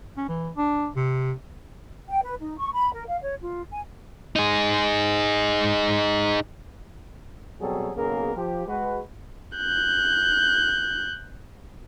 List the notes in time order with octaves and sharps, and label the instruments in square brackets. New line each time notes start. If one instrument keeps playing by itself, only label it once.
[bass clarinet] C#4
E3
D4
C3
[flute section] G5
B4
D#4
C#6
B5
A#4
F5
C#5
F4
G#5
[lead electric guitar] D#4 G#4
[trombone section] B2 F#3 G3 C4 G#4 A4
B1 C#3 A#3 B3 G#4 A#4
F3 G4
G#3 F#4 B4
[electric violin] F#6 G6